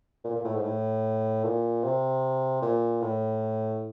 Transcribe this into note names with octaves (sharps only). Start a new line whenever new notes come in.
A#2
A#2
A2
G#2
A2
A#2
C3
A#2
A2